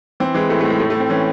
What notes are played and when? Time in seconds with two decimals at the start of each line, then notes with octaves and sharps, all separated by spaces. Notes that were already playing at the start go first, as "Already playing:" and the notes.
0.20 E3 C4
0.34 E3 G#3
0.49 A2 A3
0.61 A3
0.65 A2 G#3
0.80 A2 A3
0.90 A3
0.95 A2 C4
1.10 E3 C#4